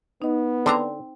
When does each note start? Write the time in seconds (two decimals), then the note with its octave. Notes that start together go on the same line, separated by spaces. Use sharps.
0.22 B3 D#4 D#5
0.66 D3 C4 C5 A#5